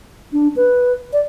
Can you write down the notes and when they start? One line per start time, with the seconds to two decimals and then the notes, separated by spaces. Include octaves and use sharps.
0.33 D4
0.56 B4
1.13 D5